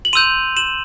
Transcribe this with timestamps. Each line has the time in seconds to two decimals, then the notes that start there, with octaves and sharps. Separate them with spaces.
0.05 F#7
0.13 C6 E6 G6 D#7 F7
0.57 E7 F#7